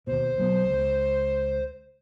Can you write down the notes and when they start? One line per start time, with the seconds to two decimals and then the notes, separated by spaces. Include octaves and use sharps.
0.07 D#2 B2 C5
0.38 B1 F#3 B3
0.69 C#2